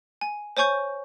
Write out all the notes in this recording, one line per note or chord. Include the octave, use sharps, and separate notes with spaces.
G#5
C5 C#5 G#5 C#6 G6